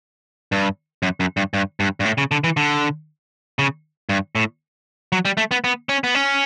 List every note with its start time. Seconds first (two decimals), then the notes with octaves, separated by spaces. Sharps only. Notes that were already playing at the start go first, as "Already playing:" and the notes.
0.52 G2
1.03 F#2
1.20 F#2
1.37 G2
1.54 G2
1.80 G2
2.00 G2
2.05 A2
2.18 C#3
2.31 D3
2.44 E3
2.57 D3
3.59 C#3
4.09 G2
4.35 A2
5.12 F#3
5.25 G3
5.37 A3
5.51 B3
5.64 B3
5.89 C#4
6.04 B3
6.15 C#4